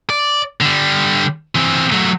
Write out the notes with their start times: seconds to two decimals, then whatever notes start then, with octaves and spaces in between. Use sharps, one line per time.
0.10 D5
0.61 D3 G3
1.55 E3 C4
1.92 F#3 A3